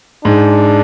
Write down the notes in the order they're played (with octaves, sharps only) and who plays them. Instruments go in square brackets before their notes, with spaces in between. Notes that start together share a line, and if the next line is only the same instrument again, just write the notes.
[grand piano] G#2 [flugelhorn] D4